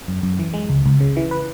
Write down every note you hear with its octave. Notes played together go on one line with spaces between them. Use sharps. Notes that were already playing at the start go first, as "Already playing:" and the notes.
F#2
F#2
E3
G#3
C#2
C#2
C#3
E3
B4